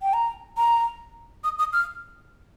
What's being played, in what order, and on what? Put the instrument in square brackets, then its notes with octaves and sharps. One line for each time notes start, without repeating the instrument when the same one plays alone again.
[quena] G5
A#5
A#5
D#6
D#6
F6